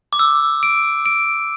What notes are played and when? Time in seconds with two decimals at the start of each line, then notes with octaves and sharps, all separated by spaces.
0.13 D6
0.19 E6
0.63 D7
1.06 D7